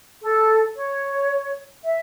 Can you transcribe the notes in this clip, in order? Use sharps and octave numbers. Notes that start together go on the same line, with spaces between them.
A4
C#5
E5